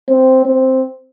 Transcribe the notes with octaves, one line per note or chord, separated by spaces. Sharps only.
C4
C4